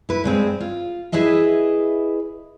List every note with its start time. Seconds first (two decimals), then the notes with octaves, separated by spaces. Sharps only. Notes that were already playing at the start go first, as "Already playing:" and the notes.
0.09 E4 B4
0.24 G2 G#3 C4
0.60 F4
1.12 E4 G#4 B4 D#5 E5